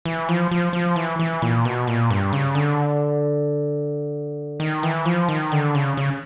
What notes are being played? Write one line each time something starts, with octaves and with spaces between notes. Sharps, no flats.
E3
F3
F3
F3
E3
E3
A#2
B2
A#2
G2
C#3
D3
D#3
E3
F3
D#3
D3
C#3
C#3